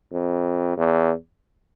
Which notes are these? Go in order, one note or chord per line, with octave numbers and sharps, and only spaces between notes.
F2
E2